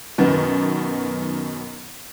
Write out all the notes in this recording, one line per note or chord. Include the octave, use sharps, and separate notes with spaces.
F#2 B2 D#3 B3